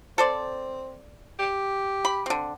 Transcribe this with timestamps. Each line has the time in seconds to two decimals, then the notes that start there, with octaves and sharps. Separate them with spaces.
0.18 C4 A4 C5 D5
1.39 G4
2.05 B5
2.26 D3 C4